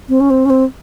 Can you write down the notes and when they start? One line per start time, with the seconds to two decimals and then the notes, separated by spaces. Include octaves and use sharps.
0.09 C4
0.21 C#4
0.30 C4
0.46 C#4
0.50 C4